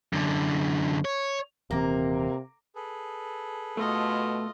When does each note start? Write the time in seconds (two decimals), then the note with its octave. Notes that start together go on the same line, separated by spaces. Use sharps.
0.13 F#2 D3
1.05 C#5
1.71 D#1 C3 E3 A#3 C4
2.76 G#4 A4 B4
3.77 B2 A3 F4 D#5